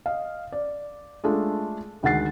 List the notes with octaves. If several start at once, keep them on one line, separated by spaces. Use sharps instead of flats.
D#5 F5
D5
G#3 A3 D4 F4 A4
D2 D#3 G#3 F#5 A6 C7